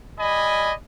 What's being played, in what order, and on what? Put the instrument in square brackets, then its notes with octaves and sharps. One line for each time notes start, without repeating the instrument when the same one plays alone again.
[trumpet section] G3 D5 D#5 G#5 B5